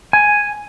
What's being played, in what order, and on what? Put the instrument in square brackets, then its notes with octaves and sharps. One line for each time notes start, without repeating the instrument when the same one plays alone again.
[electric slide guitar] G#5